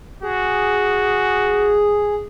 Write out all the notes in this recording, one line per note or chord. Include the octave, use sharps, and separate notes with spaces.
F#4 G#4